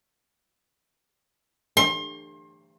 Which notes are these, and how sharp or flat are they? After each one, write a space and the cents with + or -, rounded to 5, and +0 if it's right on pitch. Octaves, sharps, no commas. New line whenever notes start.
C6 +35